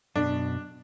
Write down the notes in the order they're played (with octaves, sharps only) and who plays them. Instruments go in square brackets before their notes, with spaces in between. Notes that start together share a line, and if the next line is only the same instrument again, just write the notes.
[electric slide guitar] F#2 B2 [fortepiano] D4